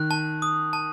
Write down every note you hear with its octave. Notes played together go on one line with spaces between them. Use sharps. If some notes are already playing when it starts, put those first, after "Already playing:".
Already playing: D#3 F#6
A5
D#6
A5